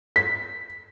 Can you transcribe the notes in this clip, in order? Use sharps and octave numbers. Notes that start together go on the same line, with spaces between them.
B6